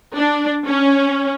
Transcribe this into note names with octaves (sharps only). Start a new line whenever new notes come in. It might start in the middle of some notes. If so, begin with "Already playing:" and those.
D4
C#4